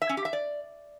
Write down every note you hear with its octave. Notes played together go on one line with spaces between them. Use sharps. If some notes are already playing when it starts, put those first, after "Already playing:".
E5
C#4
G4
E5
D5